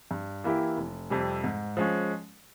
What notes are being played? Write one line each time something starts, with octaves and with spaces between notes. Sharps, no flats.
G2
E3 A#3 E4 G4
F1
F2 C3 G3
G#2
F3 G#3 C#4